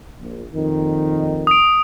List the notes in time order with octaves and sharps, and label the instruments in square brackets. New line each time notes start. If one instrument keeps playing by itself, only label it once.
[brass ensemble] A#1
F2 A#2 D#3
[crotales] D#6 D7